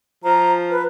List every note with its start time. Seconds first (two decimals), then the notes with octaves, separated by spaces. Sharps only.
0.24 F3 A#5
0.71 B4